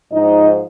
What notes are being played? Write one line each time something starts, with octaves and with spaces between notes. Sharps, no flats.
G#2 F3 D#4 D#5